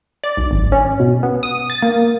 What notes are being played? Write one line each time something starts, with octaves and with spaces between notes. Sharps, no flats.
D5
B1
G#1
C#4
B2
B3
D#6
A6
A#3